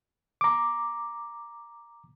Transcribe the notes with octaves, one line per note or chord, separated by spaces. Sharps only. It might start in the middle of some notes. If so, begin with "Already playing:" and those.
A#5 D6